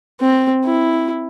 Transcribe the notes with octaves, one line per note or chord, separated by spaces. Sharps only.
C4
E4